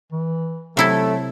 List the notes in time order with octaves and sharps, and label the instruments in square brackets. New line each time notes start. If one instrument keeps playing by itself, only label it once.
[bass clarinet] E3
[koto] C3 E4 A4 [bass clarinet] F#3 [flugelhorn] A3